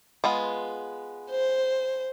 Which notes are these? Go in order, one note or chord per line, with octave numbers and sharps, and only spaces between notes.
G#3 B3 F4
C5